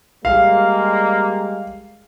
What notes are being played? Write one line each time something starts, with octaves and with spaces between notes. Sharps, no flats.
G3 G#3 A#3 F5